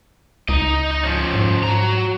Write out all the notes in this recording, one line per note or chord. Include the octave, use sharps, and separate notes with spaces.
C#2 D#4 D#5
D#4
F3 C#4
G#2
F#3 A#5